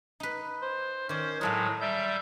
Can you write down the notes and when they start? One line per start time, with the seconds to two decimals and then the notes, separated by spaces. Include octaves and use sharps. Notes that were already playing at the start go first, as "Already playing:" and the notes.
0.20 D#4 B4
0.62 C5
1.09 D#3 C#4 C5 D5
1.41 A2 F#3 G#3 F4 A4 A#4
1.81 G3 E5 G6